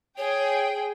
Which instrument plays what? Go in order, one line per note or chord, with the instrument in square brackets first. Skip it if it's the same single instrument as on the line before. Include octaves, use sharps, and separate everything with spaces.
[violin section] G#4 G5 [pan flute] C#5